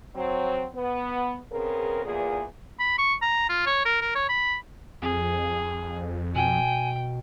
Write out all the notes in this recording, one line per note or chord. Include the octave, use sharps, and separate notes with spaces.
F#3 C4
B3
C#3 B3 C4 G#4 A#4
E2 A#2 G#4
B5
C#6
A#5
F4
C#5
A#4
A#4
C#5
B5
F2 G#4
B2 G5 G#5